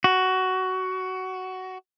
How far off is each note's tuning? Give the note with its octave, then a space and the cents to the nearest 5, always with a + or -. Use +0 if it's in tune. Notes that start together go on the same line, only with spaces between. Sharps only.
F#4 +15